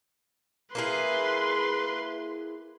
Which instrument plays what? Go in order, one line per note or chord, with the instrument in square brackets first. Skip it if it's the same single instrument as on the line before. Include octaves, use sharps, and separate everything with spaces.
[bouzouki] A#3 E4 G#4 [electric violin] B4 C6